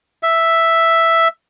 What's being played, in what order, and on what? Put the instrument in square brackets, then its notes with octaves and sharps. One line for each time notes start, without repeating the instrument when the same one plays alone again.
[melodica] E5